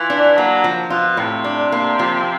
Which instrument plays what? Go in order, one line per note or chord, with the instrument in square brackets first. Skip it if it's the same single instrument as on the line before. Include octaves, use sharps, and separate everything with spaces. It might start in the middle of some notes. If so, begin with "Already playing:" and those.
Already playing: [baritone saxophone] E3 [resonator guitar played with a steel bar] F4
[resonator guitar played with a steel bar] D4
[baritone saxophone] F#3 [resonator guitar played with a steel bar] A#3
[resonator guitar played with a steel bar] F3
[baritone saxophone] B2 [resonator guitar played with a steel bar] F4
[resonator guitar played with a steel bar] A2 [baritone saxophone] C3
[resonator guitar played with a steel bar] D4
A#3
F3